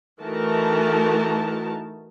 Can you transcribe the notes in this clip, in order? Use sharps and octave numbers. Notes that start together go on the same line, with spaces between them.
E3 A3 D#4 F#4 A#4 A5